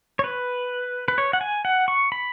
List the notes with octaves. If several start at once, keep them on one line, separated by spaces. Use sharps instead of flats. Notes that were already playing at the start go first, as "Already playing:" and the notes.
C#5
B4
B4
C#5
F#5
G#5
F#5
C#6
B5